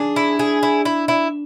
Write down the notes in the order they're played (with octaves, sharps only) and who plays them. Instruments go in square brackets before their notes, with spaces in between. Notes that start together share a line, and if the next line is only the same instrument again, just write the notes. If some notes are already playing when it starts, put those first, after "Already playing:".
Already playing: [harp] D4 [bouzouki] G#4
[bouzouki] E4
G#4
E4
E4
E4